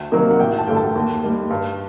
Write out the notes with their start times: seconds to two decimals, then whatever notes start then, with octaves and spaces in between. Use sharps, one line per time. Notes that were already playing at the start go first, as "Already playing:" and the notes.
Already playing: D2
0.12 C3 D#3 F#3 A#3
0.31 F#5
0.39 A1 G5
0.59 A5
0.67 G2 D3 A3 G5
0.77 A5
0.96 D#2
1.23 D#3 G3
1.50 G2